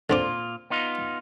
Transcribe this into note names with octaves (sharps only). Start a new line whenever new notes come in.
A#2 D3 C4 F4 D6
B3 D#4 F4